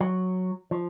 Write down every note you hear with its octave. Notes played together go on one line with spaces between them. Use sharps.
F#3
F3